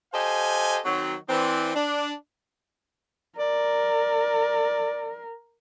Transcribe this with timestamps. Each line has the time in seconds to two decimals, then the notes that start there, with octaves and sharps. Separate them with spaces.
0.14 G4 A4 C5 D#5 F5 G#5
0.85 D#3 F#3 C4
1.29 E3 C4 D4
1.74 D4
3.38 A#4 D5